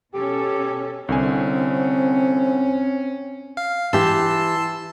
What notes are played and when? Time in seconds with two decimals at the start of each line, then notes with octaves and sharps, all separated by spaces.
0.14 B2 C#4 G4 A4
1.09 C2 D3 C4 C#4 G#5
3.57 F5
3.93 E3 G4 A5 C6 E6